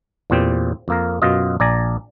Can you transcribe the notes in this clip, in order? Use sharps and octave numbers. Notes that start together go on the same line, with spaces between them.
E2 A#2 C4 G4
F2 A#3 A#4
F#2 B2 F4 D#5
A#1 D5 G#5 A#5